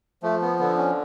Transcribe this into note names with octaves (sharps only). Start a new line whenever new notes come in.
F3 A3
B3
D3 B3
C#4